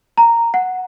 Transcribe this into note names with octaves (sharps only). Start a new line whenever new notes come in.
A#5
F#5